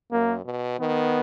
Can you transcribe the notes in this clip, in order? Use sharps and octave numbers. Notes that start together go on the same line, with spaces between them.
F#2 A#3
B2
D#3 B3